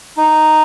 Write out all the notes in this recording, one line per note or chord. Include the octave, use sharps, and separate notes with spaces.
D#4